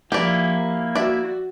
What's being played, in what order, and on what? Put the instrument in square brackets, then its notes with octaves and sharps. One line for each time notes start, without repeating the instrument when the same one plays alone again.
[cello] F3 [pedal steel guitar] A#3 E4 [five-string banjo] G4 D5
[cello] F#4 [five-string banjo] D5 E5